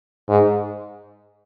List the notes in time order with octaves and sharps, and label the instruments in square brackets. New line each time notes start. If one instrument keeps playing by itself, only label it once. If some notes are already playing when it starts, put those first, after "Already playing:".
[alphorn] G#2